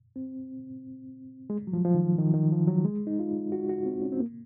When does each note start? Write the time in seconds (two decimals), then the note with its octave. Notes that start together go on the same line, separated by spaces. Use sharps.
0.16 C4
1.50 G#3
1.67 F#3
1.73 F3
1.85 F3
1.95 D#3
2.18 D#3
2.34 D#3
2.52 F3
2.68 F#3
2.84 G#3
3.07 D#4
3.19 F4
3.52 F#4
3.69 F#4
3.86 C4
4.02 C#4
4.12 C4
4.20 A#3